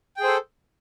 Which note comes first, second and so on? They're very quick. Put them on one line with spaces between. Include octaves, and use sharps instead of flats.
G5 G#4 C5 A4